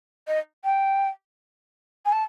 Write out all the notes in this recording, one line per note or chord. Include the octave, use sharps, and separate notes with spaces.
D#5
G5
G#5
A5